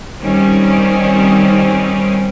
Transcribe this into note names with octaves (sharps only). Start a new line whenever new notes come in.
D#3 G3 C4 C#4